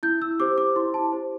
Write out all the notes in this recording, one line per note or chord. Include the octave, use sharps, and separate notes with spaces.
E4 G6
E6
G4 C5 D6
D6
E4 C6
A5
G4 C5